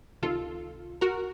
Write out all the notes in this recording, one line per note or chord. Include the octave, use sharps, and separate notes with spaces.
C#2 C3 D#3 F4 A4
F#4 A#4